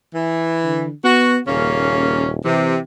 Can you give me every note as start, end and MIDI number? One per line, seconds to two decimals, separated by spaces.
0.15 0.86 52
0.64 0.92 50
1.04 1.39 59
1.04 1.38 66
1.47 2.40 27
1.47 2.30 49
1.47 2.30 58
1.47 2.30 61
2.44 2.78 48
2.44 2.79 52